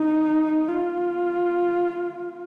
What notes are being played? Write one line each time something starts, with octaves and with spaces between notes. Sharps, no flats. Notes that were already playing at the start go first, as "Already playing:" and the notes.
Already playing: D#4
F4